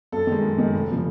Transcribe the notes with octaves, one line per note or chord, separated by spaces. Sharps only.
F#2 A4
D#3
G#3
F#2
D#3 G#3
F1
C#3 F3